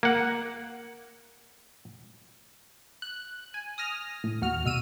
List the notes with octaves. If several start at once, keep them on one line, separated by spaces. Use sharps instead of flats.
A#3 F#5
F#6
G#5
D#6 F6 A#6
A2
D#2 F#4 F6
B2 E6 D#7